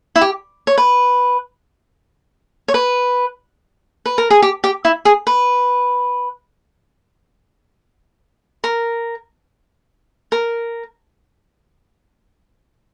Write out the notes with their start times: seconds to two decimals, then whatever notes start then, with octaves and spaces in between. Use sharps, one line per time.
0.16 E4
0.21 G4
0.67 C#5
0.77 B4
2.68 C#5
2.74 B4
4.05 B4
4.18 A#4
4.30 G#4
4.42 G4
4.64 G4
4.85 E4
5.05 G#4
5.27 B4
8.64 A#4
10.32 A#4